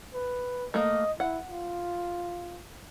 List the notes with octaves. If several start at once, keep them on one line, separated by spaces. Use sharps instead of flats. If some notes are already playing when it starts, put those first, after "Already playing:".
B4
A3 A#3 D#5
E4 F#5
F4